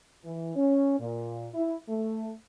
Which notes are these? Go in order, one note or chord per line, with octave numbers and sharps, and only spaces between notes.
E3
C#4
A#2
E4
A3